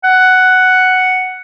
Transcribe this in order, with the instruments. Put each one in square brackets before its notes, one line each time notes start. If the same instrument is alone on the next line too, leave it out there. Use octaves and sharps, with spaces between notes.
[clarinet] F#5